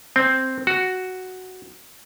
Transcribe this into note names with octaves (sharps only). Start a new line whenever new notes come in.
C4
F#4